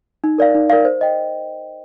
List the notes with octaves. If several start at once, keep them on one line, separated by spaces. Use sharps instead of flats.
D#4
A#4 D5 F5
D#4
A#4 D5 F5
C5
D#5 G5